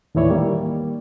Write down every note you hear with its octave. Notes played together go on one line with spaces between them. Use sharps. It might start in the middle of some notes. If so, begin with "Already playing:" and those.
D#2 A2 E3 E4 C#5 D5
D#3 G3 A#3